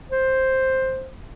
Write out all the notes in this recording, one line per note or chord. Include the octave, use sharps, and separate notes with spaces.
C5